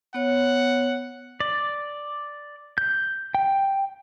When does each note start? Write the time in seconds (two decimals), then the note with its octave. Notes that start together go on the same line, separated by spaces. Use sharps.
0.14 B3 C#5 F#5
1.40 D5
2.78 G6
3.35 G5